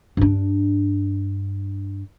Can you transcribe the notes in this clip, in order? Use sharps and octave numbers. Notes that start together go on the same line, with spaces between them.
G2 D4